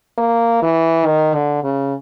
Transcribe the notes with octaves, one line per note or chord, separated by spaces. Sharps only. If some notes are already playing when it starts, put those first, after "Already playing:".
A#3
E3
D#3
D3
C#3